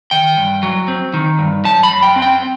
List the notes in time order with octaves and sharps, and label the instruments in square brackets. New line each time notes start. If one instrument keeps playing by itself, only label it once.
[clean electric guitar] D#3 G5
G2
F#3
C4
D#3
G2
F#3 A5
B5
F#2
G5
C4
G5